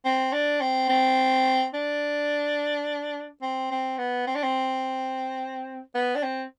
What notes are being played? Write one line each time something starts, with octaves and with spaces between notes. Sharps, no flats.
C4
D4
C4
C4
D4
C4
C4
B3
C4
D4
C4
B3
D4
C4